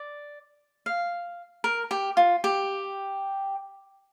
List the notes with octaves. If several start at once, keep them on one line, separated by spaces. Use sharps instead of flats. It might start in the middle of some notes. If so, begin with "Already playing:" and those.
Already playing: D5
F5
A#4
G4
F4
G4